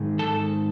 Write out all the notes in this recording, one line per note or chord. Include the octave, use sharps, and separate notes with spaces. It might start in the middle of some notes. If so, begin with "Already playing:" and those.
Already playing: G#2 D#3 G#3
A4 A5